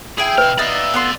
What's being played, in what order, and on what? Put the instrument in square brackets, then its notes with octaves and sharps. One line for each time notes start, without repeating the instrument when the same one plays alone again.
[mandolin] E4 G5 [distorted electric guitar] G#4
[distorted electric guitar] B2 F5 [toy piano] B4
[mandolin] B3 D#4 E5 [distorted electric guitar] D5 F5
[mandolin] B3 A4 C6